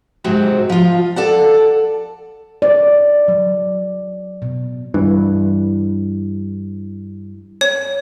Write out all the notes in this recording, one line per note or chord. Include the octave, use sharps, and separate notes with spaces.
G#2 C3 F#3 C4 F#4
F3 F4
A4 D5 F#5
D5
F#3
B2
G2 E3
C#5